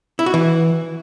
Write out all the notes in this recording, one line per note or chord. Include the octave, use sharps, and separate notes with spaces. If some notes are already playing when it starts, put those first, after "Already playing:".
E4
F#4
E3